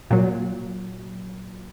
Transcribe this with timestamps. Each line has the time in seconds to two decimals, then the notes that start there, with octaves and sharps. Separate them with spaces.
0.11 A#2 F#3